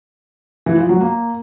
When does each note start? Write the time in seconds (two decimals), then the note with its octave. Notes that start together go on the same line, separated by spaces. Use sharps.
0.66 E3
0.78 F3
0.89 F#3
1.01 A#3